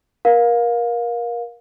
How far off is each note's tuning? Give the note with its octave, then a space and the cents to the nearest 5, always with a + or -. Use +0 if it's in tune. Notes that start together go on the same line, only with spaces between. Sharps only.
A#4 +25 F5 +20